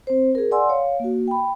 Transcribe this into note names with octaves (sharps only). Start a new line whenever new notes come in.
C4 C5
G#4 A#4
D5 F#5 G#5 C6 E6
C#5 F5
A#3 F#4
G5 B5